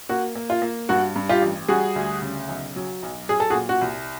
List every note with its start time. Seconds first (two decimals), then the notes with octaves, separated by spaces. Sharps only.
0.09 A#3 F#4
0.36 A#3
0.50 F4
0.62 A#3
0.89 G2 F#4
1.16 G2
1.29 F4 G4
1.42 A1
1.68 G3 F#4 G#4
1.96 D2
2.22 C#3
2.49 B1
2.76 F#3
3.03 B1
3.29 F#3 G#4
3.40 A4
3.50 F#4 G#4
3.55 A#2
3.69 F#4
3.81 C2